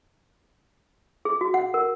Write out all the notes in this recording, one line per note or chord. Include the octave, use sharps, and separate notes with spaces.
G#4
F#4
F#5
A#4